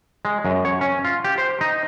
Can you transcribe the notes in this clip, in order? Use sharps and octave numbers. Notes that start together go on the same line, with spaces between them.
G#3
F#2
C#5
C#4
F4
G4
C5
D#4